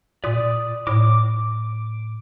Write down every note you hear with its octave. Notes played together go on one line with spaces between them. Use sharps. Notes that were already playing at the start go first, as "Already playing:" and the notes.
A#2 D5 D#6
A2 D6